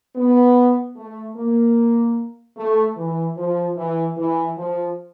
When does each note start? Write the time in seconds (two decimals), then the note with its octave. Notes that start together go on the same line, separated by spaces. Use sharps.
0.16 B3
0.97 A3
1.36 A#3
2.57 A3
2.97 E3
3.37 F3
3.77 E3
4.17 E3
4.58 F3